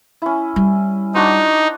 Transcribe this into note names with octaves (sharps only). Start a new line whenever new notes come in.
C#4 E4
G3
D4 D#4 F#4 C5